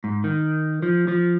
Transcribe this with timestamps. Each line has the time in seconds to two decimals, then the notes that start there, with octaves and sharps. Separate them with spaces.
0.04 G#2
0.24 D#3
0.82 F3
1.08 F3